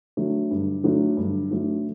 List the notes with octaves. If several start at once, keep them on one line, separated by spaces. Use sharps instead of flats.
D3 F#3 A3
G2
D3 F#3 A3
G2
D3 F#3 A3